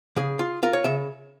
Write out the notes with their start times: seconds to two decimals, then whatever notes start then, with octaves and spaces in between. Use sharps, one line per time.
0.16 C#3 G#4
0.39 F4
0.63 F4 A#4
0.73 C#5
0.84 C#3 E5